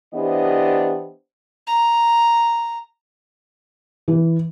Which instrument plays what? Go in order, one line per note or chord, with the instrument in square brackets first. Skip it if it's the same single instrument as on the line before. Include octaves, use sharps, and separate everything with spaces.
[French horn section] E3 B3 D4 G4 C5 D#5
[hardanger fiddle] A#5
[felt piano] E3